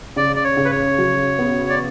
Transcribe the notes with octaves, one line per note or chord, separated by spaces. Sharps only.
C#3 D5
D5
C#5
C#3
B4
C#5
F#3
B3
D5